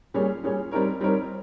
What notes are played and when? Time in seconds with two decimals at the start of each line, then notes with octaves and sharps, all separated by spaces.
0.14 A#2 G3 C#4 G#4 C#5
0.43 A#2 G3 C#4 G#4 C#5
0.71 G3 C4 D#4 A#4 C#5
1.01 G3 C4 D#4 A#4 C#5